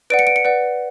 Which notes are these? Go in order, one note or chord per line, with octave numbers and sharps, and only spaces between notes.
B4 D5 F#5 D7
C#7
D7
C#7
B4 D5 F#5